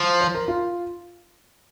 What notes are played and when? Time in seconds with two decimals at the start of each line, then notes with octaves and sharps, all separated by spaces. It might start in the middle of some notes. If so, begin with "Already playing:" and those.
Already playing: F3
0.21 C5
0.35 A#4
0.48 F4